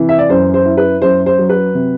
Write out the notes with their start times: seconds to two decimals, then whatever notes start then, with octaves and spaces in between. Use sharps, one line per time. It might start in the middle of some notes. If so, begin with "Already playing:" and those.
Already playing: C3 E3
0.09 E5
0.19 D5
0.29 F#2 C5
0.54 C5
0.66 E4
0.77 B4
1.02 F#2 C5
1.26 C5
1.38 F#3
1.49 B4
1.74 C3